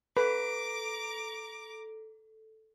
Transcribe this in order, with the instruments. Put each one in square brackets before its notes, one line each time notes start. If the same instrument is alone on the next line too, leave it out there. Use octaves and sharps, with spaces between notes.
[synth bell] A4 [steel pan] B4 [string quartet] A#5 D6